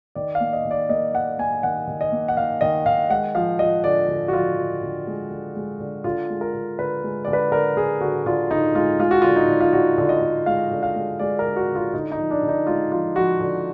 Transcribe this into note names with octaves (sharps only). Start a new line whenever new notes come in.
D#3 D5
F5
A#3
D#5
D#3
D5
A#3 D#5
D#3 F#5
A#3 G#5
D#3 F#5
D#3
D#5
A#3
F#5
D#3 F5
D#3 D#5
D#3 F5
G#3 F#5
F3 F5
F3 D#5
D3 D5
D3
F#4
F3 F4
F3
D3
G#3
D3
G#3
D3
D3 F4
G#3
A#4
D3
D3 B4
G#3
D3 D5
B4
D3 A#4
D3 G#4
D3 F#4
D3 F4
D3 D#4
G#3 F4
G#3 F4
F#4
D3 F4
D#4
D3
F4
D3 F#4
D3
D#5
D3
G#3 F5
D3
F5
G#3
G#3 D5
A#4
D3
F#4
D3
F4
D3 D#4
D#4
F3
D4
D3
D#4
G#3 F4
F3 F4
F3 F#4
D3